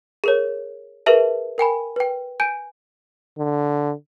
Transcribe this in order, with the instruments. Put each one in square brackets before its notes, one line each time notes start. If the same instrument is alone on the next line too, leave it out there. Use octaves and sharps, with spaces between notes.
[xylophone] G#4 A#4 C#5
G#4 A#4 B4 E5 A5
A#4 G5 G#5 B5
B4 G5
G#5 G6 D7 D#7
[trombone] D3